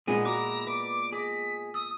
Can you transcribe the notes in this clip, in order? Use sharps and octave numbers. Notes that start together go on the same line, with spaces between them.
A#2 G#3 B3 C4 D#4 G#5
E4 F#4 A#5 D6
B4 D5 D6
G#4 D#5 B6
D#6 E6